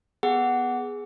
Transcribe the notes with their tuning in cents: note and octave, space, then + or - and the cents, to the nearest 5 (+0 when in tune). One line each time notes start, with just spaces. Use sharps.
B3 +0 G#4 +0 F#5 +10